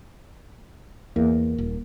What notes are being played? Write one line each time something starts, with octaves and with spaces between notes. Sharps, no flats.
E2 A#3
D#1